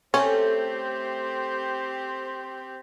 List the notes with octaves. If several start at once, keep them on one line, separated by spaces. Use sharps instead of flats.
A3 C4 C#4 G4 C5